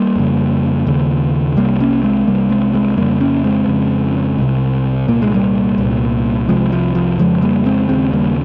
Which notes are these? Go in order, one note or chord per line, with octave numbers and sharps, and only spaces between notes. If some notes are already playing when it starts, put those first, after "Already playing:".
Already playing: G3 A#3
F2 C#3
D#2 C#3
C2 C3 G3 A#3
A#3 C#4
G#3 C4
C2 C3 G3 A#3
G#3 C4
G#3 C4
F2 C#3 G3 A#3
A#3 C#4
G#3 C4
F2 C#3
C2 C3
C2 A#2 A#3
G#3
G3 A#3
C2 A#2
C2 C3 F3 G#3
F3
F3
F2 C#3 F3 G#3
G3 A#3
G#3 C4
D#2 C#3 G#3 C4
G3 A#3